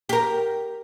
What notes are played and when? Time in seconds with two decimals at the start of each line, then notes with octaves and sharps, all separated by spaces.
0.09 G4 A#4